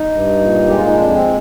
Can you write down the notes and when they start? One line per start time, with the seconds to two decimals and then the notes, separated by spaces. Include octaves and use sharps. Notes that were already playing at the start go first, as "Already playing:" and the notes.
Already playing: D#4
0.12 G2
0.39 A#2
0.67 G#3 G4
0.77 F4
0.86 D#4
0.94 F2 D4
1.14 C4